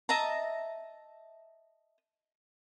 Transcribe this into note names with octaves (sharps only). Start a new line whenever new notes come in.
D#5 E5 A5 A#5